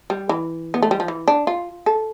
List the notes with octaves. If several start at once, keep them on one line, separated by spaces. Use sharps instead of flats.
G3
E3
B3
A3
G3
F3
E3
D4
F4
A4